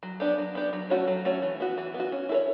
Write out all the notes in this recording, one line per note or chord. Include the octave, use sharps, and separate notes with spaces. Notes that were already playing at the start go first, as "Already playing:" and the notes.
F#3
B3 D4 G4
F#3
B3 D4 G4
F#3
A3 C#4 F#4 C#5
F#3
A3 C#4 F#4 C#5
E3
B3 F#4
E3
B3
F#4
C#4
E4 A4
C#5